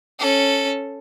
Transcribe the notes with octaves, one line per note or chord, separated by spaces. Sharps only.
C#4 A4